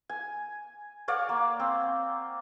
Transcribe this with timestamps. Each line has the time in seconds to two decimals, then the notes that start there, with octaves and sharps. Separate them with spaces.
0.09 G#5
1.08 C#5 D5 F5 F#5
1.29 A#3
1.60 C4